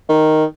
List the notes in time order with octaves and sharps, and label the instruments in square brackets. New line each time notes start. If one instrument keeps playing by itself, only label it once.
[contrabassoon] D#3